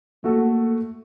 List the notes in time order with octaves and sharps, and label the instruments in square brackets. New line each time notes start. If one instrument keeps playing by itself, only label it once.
[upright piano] A3 F#4 A4 [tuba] A#3